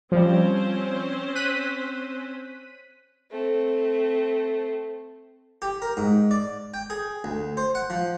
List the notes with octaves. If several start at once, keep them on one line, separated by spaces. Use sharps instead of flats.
F3 G3 C4 C#4 C5
F#6 B6 D#7
A3 C4
G4
A#4
G#2
D5
G5
G#4
D2
C5
F#5
F3